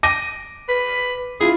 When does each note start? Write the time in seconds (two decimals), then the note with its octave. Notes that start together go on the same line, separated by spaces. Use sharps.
0.03 D6 A#6 D#7
0.69 B4
1.40 E4 F4 G#4